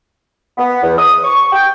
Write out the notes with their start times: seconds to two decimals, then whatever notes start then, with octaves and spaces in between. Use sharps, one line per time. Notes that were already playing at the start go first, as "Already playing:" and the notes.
0.58 B3
0.83 E2
0.98 D#6
1.23 C#6
1.53 G5